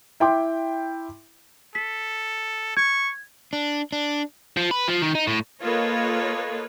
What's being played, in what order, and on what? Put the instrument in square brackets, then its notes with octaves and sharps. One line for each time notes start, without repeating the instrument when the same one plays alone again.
[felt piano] E4 G5 C6 D6
[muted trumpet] A4 [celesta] B6
[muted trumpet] C#6 [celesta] G#6
[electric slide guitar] D4
D4
[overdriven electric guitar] F3
B4
F3
D#3
D#4
A2
[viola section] A#3 F4 A4 B4 C#5 D#5